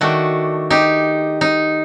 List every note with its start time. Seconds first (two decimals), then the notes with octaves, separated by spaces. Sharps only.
0.01 D#3 A3 D4 F#4
0.70 D#4 G4
1.41 D#4